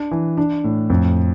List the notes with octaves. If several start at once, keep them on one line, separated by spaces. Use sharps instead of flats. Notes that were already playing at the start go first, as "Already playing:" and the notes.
Already playing: D4
E3
D4
A2
F2